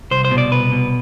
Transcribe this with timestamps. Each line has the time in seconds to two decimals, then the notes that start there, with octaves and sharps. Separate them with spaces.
0.11 C2 C5
0.25 C5
0.31 B2
0.38 D5
0.52 C2 B4
0.72 B2